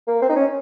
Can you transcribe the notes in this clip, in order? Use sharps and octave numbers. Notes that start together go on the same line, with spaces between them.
A#3
C4
D#4
C#4